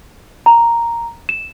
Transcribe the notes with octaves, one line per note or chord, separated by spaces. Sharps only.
A#5
E7